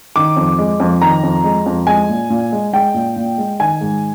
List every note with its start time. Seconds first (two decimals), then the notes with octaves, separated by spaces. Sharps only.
0.16 D#3 D6
0.36 F2
0.59 G#3
0.80 F2
1.02 D#3 A#5
1.23 F2
1.44 G#3
1.66 F2
1.87 G#3 G#5
2.09 A#2
2.30 A#2
2.52 G#3
2.73 G#3 G5
2.94 A#2
3.16 A#2
3.38 G#3
3.60 D#3 G#5
3.81 G#2